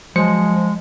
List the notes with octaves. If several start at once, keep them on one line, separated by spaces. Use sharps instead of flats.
F3 F#3 G#3 C5 C#7